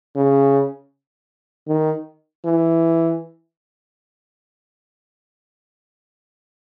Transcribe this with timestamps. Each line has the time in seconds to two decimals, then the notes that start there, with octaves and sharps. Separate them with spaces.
0.16 C#3
1.68 D#3
2.45 E3